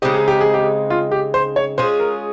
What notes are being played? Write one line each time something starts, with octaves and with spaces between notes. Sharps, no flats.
C#3 G#3 C4 D#4 G4
G#4
G4
G#4
G4
F4
G4
C5
C#5
G#3 C#4 F4 G#4 C5
A#4